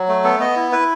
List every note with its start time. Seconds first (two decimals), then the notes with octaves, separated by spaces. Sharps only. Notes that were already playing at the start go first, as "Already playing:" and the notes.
Already playing: F#3
0.08 A3
0.24 B3 A4
0.40 B3 D#5
0.56 E4
0.72 E4 B4